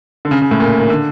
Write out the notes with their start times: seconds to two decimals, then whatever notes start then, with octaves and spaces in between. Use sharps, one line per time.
0.25 D3
0.31 C#3
0.42 C#3
0.51 A2
0.60 A#2
0.79 D#3
0.90 D3